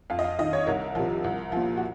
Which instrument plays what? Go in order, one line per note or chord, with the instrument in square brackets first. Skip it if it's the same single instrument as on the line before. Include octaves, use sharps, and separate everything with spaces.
[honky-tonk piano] F2 F5
D#5
F5
D#3 D#5
C#5
C2 A#4
C3 F3
C2
A#2 F3
F#4